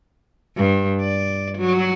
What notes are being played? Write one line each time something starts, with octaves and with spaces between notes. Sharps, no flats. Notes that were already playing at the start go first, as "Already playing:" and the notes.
G2
D5
F#3